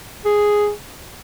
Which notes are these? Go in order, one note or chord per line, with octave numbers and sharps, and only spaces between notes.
G#4